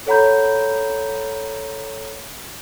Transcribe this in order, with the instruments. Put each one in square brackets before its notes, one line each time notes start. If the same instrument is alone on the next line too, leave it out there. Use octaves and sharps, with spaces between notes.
[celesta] A4 C#5 F#5 A#5 B5 G6